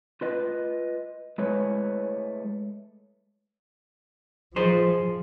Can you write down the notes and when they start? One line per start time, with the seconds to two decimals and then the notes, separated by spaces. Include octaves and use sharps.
0.21 F4 B4 D#5
1.38 G#3 A3 E4 B4 C#5
4.56 F3 G#4 C5